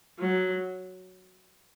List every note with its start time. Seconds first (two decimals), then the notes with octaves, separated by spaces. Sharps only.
0.19 F#3